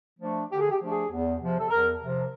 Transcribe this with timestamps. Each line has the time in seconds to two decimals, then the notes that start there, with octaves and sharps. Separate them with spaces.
0.20 F3 A3 D4
0.50 D3 G4
0.60 G#4
0.71 G4
0.80 F3 A3 D4
0.90 G#4
1.10 E2
1.40 C3 F3
1.59 A4
1.70 E2 A#4
2.01 C3 F3